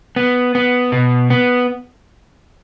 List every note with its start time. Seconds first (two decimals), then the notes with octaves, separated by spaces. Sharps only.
0.16 B3
0.55 B3
0.92 B2
1.30 B3